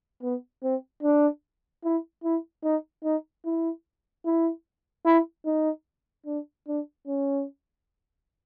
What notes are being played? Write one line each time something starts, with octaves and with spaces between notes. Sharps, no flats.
B3
C4
D4
E4
E4
D#4
D#4
E4
E4
E4
D#4
D4
D4
C#4